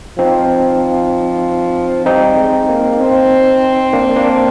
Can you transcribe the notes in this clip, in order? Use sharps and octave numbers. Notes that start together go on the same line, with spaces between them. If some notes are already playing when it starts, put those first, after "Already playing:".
F3 C4 D#4
G3 C4 D#4
G#3
A#3
C4
A#3 D4
A#3 D4